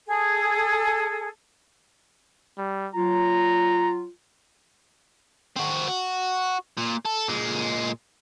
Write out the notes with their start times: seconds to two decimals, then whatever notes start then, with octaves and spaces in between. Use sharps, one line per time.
0.06 G#4 A4
2.58 G3
2.95 F#3 F4 A#5
5.57 C4 F#4
5.88 F#4
6.78 A#2
7.06 A4
7.28 A#2 G#3